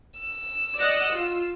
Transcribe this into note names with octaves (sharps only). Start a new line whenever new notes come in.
E6
D5 D#5 F#5
F4